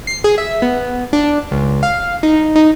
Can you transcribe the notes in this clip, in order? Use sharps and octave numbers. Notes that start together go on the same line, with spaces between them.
C7
G#4
E5
B3
D4
C#2
F5
D#4
D#4